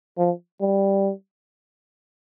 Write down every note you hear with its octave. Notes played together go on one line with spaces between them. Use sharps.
F3
G3